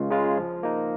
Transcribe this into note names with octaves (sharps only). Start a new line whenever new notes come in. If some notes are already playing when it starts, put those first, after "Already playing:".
Already playing: C#2 C#3 G#3 F4
C#3 G#3 F4
F3
A#3 D#4